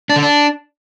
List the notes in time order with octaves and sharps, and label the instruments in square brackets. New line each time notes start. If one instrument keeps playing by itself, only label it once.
[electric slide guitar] D4
D3
D4